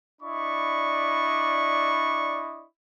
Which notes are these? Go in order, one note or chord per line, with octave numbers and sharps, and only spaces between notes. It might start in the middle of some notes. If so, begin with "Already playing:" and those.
D4 E4 D5 D#5 B5 C#6